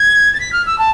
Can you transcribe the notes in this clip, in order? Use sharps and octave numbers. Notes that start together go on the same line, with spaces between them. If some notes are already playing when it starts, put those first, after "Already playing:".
Already playing: G#6
A6
B6
F6
E6
A5